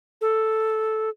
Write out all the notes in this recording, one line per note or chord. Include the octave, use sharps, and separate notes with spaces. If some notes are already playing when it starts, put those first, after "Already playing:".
A4